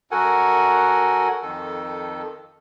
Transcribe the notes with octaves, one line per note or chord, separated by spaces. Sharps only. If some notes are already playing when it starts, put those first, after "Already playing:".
F#2 F#4 A4 A#4 F#5 G#5
F2 D#3 A4